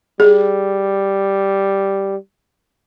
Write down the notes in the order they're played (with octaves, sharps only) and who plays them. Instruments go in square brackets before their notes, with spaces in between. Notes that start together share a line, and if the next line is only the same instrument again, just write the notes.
[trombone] G3 [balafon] G#4